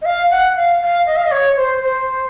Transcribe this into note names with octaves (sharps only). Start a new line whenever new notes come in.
D#5
F5
F#5
F5
F5
D#5
F5
D#5
C#5
C5
C5